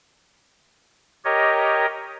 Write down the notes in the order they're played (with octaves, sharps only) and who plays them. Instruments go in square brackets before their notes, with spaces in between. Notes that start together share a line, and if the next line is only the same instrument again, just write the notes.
[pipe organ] G4 A#4 C#5 D#5